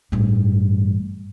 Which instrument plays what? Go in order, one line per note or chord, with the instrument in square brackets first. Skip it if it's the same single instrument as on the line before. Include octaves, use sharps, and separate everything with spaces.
[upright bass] A1 G2